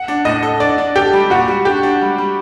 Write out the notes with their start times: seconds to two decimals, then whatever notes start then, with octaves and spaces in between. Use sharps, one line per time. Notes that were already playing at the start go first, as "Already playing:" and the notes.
Already playing: F#5
0.08 D4
0.25 A2 D#5
0.43 A4
0.60 D4 D5
0.78 D4
0.96 G4 A4
1.13 G3
1.30 A#2 F#4
1.48 G3
1.65 D4 G4
1.83 D4
2.01 G3
2.18 G3